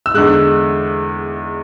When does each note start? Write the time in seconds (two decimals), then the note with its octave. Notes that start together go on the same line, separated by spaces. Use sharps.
0.06 E6
0.14 E2 D3 G#3 F#6